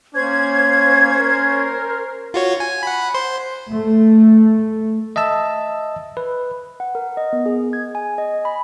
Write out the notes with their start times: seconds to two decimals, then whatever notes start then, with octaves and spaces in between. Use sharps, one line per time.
0.15 A#3 C#4 C5 G#6
1.19 A#4
2.34 F4 F#4 C#5
2.60 G#5
2.83 F#5 B5
3.14 C5 C6
3.71 A3
5.16 D#5 E5 A5 E6
6.17 B4
6.80 F#5
6.95 A#4
7.17 D#5
7.33 B3
7.46 G#4
7.73 G#6
7.95 G#5
8.18 D#5
8.45 B5